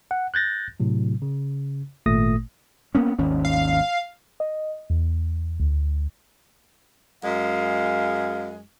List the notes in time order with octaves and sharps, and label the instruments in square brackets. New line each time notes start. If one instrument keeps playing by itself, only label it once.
[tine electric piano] F#5
F#6 G6 A6 A#6
A2 C3 F#3
C#3
G#1 A#2 A3 D#6 A#6
[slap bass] A#3 B3 C#4
G#1 D#2 C#4
[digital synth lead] F5
[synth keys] D#5
E2
D2
[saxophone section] F#2 G#3 [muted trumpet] F5